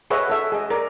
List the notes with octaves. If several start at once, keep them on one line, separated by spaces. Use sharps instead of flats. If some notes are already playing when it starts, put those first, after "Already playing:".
G#4 B4 C#5 D#5 E5 F#5
A4 E5
G#4 D#5
A#4 D5